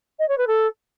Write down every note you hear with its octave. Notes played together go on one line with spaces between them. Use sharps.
D#5
C#5
B4
A4